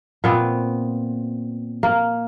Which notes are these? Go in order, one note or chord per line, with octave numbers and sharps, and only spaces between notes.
A#2 B3 C4
A#3